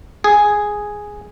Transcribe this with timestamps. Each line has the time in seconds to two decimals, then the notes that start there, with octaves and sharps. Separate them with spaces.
0.24 G#4